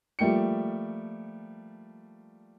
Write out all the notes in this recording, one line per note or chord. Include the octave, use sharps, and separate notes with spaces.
F3 G3 A3 A#3 G5 C#7